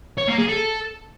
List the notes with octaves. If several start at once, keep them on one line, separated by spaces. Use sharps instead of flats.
C#5
A#3
G#4
A4